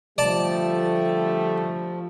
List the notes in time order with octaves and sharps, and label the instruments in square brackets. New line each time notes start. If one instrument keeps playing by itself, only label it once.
[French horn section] D3 G3 A3 [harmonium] F3 [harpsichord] D5 A5